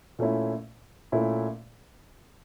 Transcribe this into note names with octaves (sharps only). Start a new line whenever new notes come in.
A#2 A3 C#4 E4
A#2 A3 C#4 E4